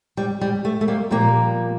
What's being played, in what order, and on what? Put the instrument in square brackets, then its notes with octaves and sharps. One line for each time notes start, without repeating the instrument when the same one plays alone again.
[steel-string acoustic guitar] G3
G3
A3
A3
G3 A#3
A#2 F3 G3 A#3